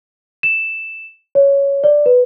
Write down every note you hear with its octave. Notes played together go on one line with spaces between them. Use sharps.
E7
C#5
D5
B4